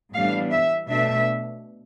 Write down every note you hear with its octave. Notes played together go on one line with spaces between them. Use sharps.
A2 E3 G3 B3 D4 F5
E5
B2 A3 D4 E5